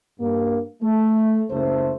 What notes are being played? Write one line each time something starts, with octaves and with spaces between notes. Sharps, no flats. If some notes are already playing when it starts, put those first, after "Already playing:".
G2 A#3
A3
F#1 C#2 A3 C5